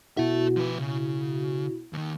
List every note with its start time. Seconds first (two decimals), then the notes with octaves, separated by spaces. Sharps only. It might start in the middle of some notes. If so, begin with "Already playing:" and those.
0.17 B2 E4 F#4 A4 E5
0.56 F3 B4
0.79 C#3
1.93 D#2 D#3